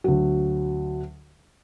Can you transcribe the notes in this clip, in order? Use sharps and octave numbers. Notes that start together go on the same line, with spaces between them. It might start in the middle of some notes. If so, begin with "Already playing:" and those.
D2 F#3